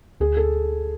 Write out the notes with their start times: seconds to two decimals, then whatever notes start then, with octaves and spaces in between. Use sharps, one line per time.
0.20 D2 G#4
0.37 A4